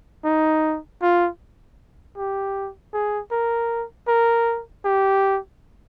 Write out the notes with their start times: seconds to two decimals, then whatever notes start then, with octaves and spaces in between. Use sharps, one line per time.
0.25 D#4
1.02 F4
2.17 G4
2.93 G#4
3.31 A#4
4.08 A#4
4.85 G4